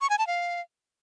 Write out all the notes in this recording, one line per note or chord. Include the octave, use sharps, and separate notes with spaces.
C#6
G#5
A5
F5